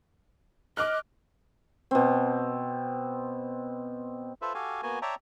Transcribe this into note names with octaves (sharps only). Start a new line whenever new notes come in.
D#5 D6 F6 F#6
B2 C4
F4 A4 B4 C5 E5
F#4 G4 A4 F5 G#5
A#3 B3 F#4 G#5
C#5 D5 E5 G5 A5 A#5